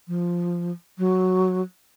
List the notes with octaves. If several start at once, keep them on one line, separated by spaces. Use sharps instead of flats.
F3
F#3